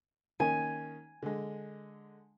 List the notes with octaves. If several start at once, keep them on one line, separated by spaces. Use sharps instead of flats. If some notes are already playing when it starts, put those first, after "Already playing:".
D#3 A#3 C#4 G#5
D3 G#3